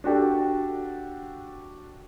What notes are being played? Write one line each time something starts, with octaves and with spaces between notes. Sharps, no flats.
D4 F#4 G4 A4